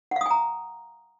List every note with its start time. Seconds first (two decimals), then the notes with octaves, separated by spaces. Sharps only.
0.11 F#5
0.16 F5
0.21 D#6
0.26 G#5
0.31 A#5